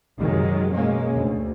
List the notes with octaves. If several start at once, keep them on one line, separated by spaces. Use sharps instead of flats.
F#2 C3 D#3 F#3 G#3
B2 G#3 A#3 C#4
D2